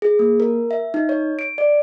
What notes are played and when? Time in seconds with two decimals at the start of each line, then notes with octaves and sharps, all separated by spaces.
0.02 G#4
0.19 A#3
0.40 A#4
0.71 E5
0.94 D#4
1.09 C#5
1.39 D7
1.58 D5